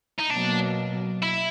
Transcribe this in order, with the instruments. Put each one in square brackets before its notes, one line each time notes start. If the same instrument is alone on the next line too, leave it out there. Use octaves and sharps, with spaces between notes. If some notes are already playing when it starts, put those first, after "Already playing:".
[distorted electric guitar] D#4
[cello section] B2 F#3 A#3 [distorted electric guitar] D4
[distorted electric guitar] E4